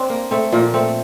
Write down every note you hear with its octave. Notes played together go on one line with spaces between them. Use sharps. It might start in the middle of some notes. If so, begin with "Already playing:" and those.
Already playing: C4 D4
A#3
A3 C4
A#2 F3 A#3
A3 C4